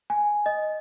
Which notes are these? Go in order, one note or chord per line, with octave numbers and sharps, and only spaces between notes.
G#5
D#5